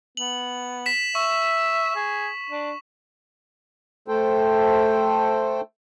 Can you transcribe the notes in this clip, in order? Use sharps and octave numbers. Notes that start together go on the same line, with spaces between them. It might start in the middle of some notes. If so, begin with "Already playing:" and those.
B3 F#7
B6 E7
E5 C#6
G#4
D4
A3 A4 C5 G5